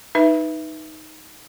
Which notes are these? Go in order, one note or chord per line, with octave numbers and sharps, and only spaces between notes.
D#4 B4 E5